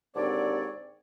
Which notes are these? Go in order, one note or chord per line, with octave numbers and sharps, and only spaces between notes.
D#2 G#2 D3 C4 C#5 D5